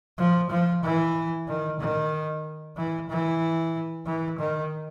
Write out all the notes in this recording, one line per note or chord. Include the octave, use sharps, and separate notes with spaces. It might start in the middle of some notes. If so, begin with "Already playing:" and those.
F3
F3
E3
D#3
D#3
E3
E3
E3
D#3